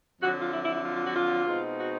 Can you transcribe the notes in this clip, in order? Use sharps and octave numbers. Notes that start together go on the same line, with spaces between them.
F2 D3 F#3 F#4
F4
E4
E4
E4
F4
F4
F#4
F4
B2 G#3 C4 D#4
F#4